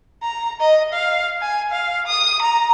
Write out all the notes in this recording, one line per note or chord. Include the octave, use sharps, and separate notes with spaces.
A#5
D#5
F5
G#5
F5
D#6
A#5